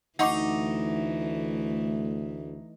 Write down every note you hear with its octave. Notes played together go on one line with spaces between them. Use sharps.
D2 E3 A3 D#4 F#5 C#6 D6